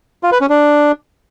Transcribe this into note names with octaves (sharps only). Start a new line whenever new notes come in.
F4
B4
C#4
D4